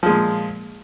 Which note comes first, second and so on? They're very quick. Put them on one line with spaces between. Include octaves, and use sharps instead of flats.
F3 G#3 A#2